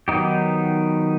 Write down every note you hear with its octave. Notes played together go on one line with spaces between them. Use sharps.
D#3 F#3 B3 D#4 G4